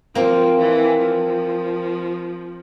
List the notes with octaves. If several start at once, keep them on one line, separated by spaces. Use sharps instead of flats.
F3 A#3 C4
E3
F3